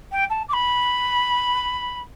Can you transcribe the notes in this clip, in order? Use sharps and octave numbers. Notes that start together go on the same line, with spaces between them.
G5
A5
D6
B5